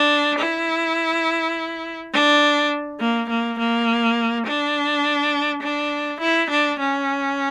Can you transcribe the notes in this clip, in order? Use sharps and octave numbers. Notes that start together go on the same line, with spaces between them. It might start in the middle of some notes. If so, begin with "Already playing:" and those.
Already playing: D4
E4
D4
A#3
A#3
A#3
D4
D4
E4
D4
C#4